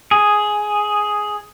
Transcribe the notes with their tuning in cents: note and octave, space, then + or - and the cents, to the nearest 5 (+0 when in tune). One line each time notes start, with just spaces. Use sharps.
G#4 +5